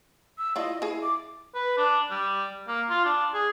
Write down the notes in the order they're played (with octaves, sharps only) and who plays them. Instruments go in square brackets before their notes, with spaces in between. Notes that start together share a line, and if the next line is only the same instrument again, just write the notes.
[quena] E6
[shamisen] E4 F4 D5 [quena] D#5
[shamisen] E4 G#4
[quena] D6
[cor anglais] B4
D4
G3
A#3
F4
D4
G#4